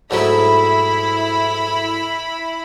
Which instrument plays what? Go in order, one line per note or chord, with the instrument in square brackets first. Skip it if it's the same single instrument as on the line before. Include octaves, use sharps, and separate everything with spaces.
[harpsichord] G#2 F#3 A3 [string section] E4 B5